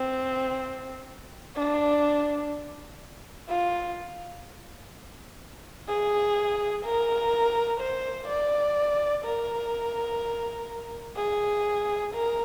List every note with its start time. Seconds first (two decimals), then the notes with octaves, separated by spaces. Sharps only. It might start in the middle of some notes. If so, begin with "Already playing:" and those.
Already playing: C4
1.56 D4
3.49 F4
5.88 G#4
6.85 A#4
7.80 C5
8.28 D5
9.25 A#4
11.18 G#4
12.14 A#4